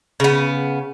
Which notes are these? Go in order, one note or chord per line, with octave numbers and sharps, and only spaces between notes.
C#3 B3